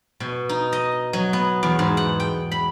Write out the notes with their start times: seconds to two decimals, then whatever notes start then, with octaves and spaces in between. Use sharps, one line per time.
0.20 B2
0.49 D#4
0.73 D#5
1.13 F#3
1.33 B3
1.63 E2
1.79 G#2
1.97 F#5
2.20 G5
2.51 B5